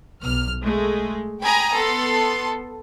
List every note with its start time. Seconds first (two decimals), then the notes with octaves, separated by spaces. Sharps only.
0.22 B1 F6
0.61 G#3 A3
1.42 G5 G#5 A#5 B5 D#6
1.75 B3 A4 C6